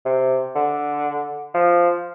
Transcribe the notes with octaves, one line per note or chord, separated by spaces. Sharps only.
C3
D3
F3